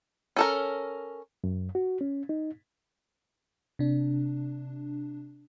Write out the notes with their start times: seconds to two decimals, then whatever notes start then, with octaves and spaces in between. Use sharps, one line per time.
0.36 C#4 A4 A#4
1.44 F#2
1.75 F#4
2.01 C#4
2.29 D#4
3.79 C3 D4